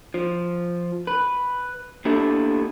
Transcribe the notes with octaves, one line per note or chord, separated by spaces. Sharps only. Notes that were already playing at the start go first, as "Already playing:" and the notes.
F3
B4
A#3 B3 D4 E4 G4 A4